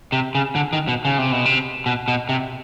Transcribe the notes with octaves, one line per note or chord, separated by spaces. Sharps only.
C3
C#3
D3
D#3
B2
C#3
C3
B2
C3
B2
B2
C3